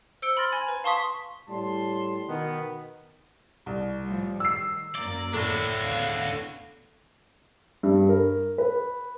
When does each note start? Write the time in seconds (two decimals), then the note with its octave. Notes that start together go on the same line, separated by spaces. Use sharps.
0.22 C5 E6 C#7 D7 G7
0.37 B5 C6 F6 A6 A#6
0.52 G#5 G#6
0.66 B4 A#5
0.84 F5 A5 C6 C#6 D#6 B6
1.48 A2 G3 A5 C6
2.28 B2 D#3 B3
3.66 C2
4.05 A2 F3 G3
4.40 D#3 E6 C7
4.95 F#2 A#3 A#4 D5
5.33 A2 D4 F#4
5.82 C#3 B3 F5
7.83 G2
8.09 A#4
8.58 B4